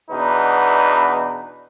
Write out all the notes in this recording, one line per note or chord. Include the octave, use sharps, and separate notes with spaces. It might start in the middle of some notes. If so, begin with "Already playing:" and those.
E2 B2 D4 D#4 B4